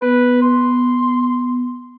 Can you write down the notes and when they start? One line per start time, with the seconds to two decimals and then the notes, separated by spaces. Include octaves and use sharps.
0.02 B3 B4
0.42 C6